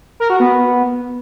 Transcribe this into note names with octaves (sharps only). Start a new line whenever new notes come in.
A#4
F#4
B3